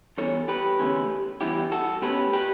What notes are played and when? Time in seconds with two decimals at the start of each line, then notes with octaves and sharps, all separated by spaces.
0.18 G2 E3 B3 A4 C#5
0.48 G4 B4
0.79 E2 D3 A3 C#4
1.41 G2 E3 B3 E4 G4
1.72 F#4 A4
2.02 B2 A3 C#4 G4 B4
2.33 G4 B4